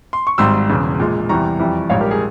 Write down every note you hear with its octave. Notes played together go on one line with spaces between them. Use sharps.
C6
C#6
G#1 G#2 G3 C6 E6
E1 E2 C#3
A#1 A#2 G#3
E2 C3 E3 G3 A#5 C#6
F2 E3 G3
A#1 G#2 G3 C#5 F5
G4 A#4
G#4